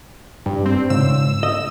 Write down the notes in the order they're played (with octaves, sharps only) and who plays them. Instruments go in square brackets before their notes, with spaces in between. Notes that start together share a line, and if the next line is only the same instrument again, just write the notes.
[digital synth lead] G2
C4
[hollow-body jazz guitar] C#2 G#2 [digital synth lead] E6
[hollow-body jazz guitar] D#5